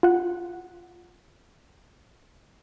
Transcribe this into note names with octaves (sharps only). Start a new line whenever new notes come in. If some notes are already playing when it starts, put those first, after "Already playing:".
F4 F#5